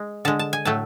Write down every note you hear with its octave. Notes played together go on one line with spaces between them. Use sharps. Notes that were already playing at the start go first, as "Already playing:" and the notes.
Already playing: G#3
D3 G#3 A5
A5
G#5
A2 F#3 A3 A5